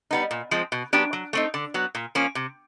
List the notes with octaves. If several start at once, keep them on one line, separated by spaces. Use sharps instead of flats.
G3 B3 D#4
A#2
F3 G#3 C4
B2
F#3 B3 D4 G4
F#3
A3 C4 D#4
D3
F#3 B3
A#2
F3 A#3 C#4
C3